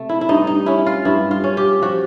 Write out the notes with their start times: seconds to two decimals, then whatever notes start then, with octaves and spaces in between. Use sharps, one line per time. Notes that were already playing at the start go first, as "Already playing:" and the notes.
Already playing: C3 A3
0.09 E4
0.21 E4
0.29 G2 D#4
0.47 D#4
0.66 C#4 E4
0.86 F4
1.05 G2 E4
1.31 F4
1.44 C#4
1.57 G4
1.82 F3 F#4